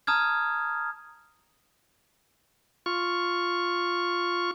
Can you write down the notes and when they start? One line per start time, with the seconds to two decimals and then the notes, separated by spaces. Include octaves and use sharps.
0.07 A5 A#5 D#6 F6 G#6
2.86 F4 C#6